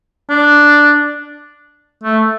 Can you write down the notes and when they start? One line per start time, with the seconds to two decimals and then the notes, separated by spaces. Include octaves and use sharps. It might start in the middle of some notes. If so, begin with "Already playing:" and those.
0.30 D4
2.03 A3